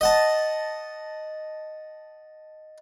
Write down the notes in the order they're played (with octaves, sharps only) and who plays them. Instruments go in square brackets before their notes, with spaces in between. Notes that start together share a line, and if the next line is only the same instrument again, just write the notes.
[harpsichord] D#5 F#5 A5